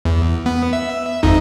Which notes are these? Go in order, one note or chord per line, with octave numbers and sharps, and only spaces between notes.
E2
B3
E5
G#1 F2 D#4